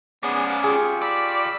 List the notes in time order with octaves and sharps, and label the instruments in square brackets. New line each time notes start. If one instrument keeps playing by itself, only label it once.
[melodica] B3 G#4 [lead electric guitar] C#4 D5
[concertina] F5 F#5 B5 [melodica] D6
[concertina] F4 G4 C#6 [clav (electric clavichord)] G#4
[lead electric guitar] D5 [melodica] B5 E6